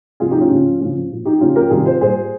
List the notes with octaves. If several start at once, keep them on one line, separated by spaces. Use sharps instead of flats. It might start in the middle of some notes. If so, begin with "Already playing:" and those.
C3 F3 F4 G#4
D#4 G4
C#4 F4
C#3 F3
C#3 F3
A#2 F3
D#4 G4
C#3 F3 C#4 F4
G4 A#4
C3 D#3 G3 F4 G#4
C5
A#2 G3 G#4 C5